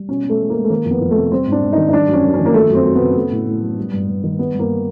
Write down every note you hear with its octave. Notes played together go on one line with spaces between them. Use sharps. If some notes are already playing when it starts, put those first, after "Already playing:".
Already playing: G3
B2 C#4
B2
A3
G#3
A#3
G#3
A3
D#3 A#3
F2
B3
F2
A3
C3
G3 C4
G#2
D4
G#2
D#3 D#4
D#4
G3 D4
F#2
C#4
F#2
C#4
D#3
A#3
F3 A3
F#2
C4
F#2
B3
C#3
A3
A2
A2
F#3
G3
G2
G2
D#3
G3 B3
G2 A#3